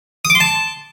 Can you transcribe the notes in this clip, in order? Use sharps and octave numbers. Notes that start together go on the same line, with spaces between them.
D#6
D6
C6
A5